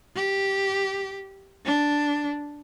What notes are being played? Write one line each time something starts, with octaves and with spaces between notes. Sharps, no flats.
G4
D4